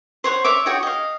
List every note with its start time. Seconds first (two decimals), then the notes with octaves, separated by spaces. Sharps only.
0.24 C5 C#5 F#5
0.44 C#5 E5 D6
0.66 F#4 G#4 C#5 G5
0.83 D#5 F5